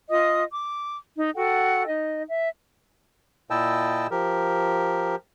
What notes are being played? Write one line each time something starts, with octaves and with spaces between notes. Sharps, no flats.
F4 D#5 D#6
D6
D#4
F#4 A4 F#5 G5
D#4 D#5
E5
A#2 E4 D#5 G5 A5 E6
F3 G4 A#4